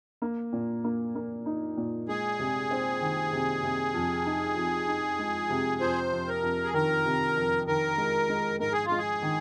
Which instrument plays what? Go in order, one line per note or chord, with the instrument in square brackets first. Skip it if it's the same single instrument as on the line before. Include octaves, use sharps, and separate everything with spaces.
[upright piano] A#3
A#2
A#3
A#3
D#4
A#2
[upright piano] G#3 [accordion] G#4
[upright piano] C3
C4
D#3
C3
C3
F2
D#4
F2
D#4
G#3
C3
[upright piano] F2 [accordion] C5
[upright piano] F2
[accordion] A#4
[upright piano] F2
[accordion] G#4
[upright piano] D#3 [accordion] A#4
[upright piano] C3
F2
[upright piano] D#3 [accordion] A#4
[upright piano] G#3
G#3
[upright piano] G#2 [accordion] A#4
[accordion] G#4
F4
[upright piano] G#3
[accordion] G#4
[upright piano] D#3